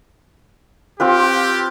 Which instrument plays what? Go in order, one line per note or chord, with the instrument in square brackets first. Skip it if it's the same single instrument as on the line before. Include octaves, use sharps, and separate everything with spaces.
[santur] C4 F4 B4 [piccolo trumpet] G4